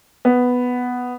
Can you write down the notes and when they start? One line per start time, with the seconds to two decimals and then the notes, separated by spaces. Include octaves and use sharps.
0.25 B3